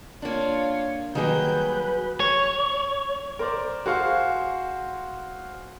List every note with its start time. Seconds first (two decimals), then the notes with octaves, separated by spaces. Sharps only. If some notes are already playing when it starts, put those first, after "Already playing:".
0.22 A#3 D4 F4 C#5
1.15 D#3 F#3 G3 A#3 G#4 B4 G6
2.20 C#5
3.39 A#4 C5 D5
3.86 F#4 G#4 C5 F5